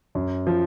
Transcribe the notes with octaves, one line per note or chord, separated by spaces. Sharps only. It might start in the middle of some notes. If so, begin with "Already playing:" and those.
F#2
F3